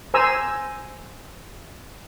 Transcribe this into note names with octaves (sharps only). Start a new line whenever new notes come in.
C5 G#5 A#5 E6